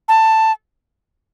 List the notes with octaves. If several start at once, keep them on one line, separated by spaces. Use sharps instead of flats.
A5